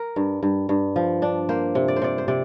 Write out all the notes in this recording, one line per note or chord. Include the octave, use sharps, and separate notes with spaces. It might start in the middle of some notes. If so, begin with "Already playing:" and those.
Already playing: A#4
G2
G2
G2
F3
D4
A#3 C5
C3
D5
C5
C3 D5
C5
C3 D5